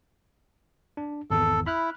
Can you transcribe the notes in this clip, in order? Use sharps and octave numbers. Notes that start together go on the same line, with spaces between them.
D4
G#1 E2 A4
E4 B5 F6 F#6